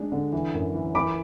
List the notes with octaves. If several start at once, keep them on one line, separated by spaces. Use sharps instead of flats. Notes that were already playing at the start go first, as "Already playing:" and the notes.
Already playing: G#3 D4
D3
E3
F#2
E3
E3 B5 D6